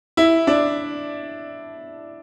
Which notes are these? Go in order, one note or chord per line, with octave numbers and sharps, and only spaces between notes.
E4
D4